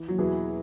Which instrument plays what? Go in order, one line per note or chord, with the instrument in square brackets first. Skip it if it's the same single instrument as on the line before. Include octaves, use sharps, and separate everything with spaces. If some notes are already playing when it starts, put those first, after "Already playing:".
Already playing: [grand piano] E3
F#3
[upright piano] E2 B2 B3 E4 G#4 [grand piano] E3